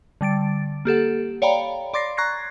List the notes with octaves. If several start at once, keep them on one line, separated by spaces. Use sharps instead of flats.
D3 G3 A6 D7
A#3 G4 A4 F#5
C#5 D5 F5 G5 A#5 B5
D5 C6 D6 A6 A#6 C7
A#5 C#6 F#6 G#6 A#6 C7